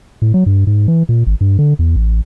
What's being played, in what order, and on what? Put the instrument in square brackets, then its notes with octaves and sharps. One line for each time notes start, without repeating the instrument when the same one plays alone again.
[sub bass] A2
F#3
G2
G#2
E3
A#2
G#1
G2
D3
E2
A1